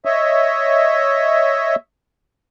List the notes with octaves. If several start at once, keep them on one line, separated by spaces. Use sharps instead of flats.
C#5 D#5 E5